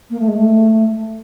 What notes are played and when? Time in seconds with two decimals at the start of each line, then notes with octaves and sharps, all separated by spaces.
0.10 A#3
0.20 A3
0.28 G#3
0.36 A3